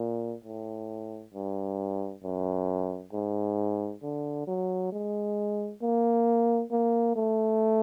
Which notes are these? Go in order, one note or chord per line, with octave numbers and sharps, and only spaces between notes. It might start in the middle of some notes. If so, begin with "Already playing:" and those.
Already playing: A#2
A2
G2
F#2
G#2
D3
F#3
G#3
A#3
A#3
A3